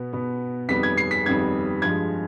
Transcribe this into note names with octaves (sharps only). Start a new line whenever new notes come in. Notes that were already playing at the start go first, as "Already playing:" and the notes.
Already playing: B2 B3
B2 B3
F2 D#3 G3 B3 B6
G#6
C7
B6
F2 D#3 G3 B3 G#6
G2 F3 G#3 G#6